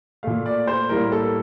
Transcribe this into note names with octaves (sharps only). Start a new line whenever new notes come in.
A#2 A3 F5
D5
C5
A2 G3 A#3 A#4
A4